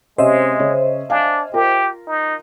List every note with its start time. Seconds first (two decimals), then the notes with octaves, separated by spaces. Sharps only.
0.18 C3 G#3 C#4 C5 D#5 E5
0.59 C#3 C#4
1.10 D4 F5 G#5
1.54 F4 G4 A#4
2.07 D#4